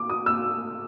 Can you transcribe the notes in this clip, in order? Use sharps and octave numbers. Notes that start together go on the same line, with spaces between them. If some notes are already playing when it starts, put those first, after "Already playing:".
Already playing: D6
D#6
E6